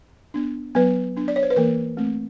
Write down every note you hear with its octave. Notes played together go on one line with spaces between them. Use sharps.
B3 D4
F#3 B3 B4
B3 D4
D5
C#5
C5
B4
E3 A#3 A#4
A3 C4